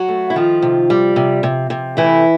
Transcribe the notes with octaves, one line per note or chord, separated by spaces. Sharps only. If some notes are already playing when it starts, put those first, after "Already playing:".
Already playing: F#3 F#4
A3
E4
D#3 F3 F4
C3
G3
C3
C3
C3
E3 A3 E4